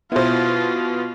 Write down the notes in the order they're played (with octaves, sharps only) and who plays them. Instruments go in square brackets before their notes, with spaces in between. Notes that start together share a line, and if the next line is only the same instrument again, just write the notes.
[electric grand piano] B2 B3 [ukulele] E4 C5 [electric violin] F4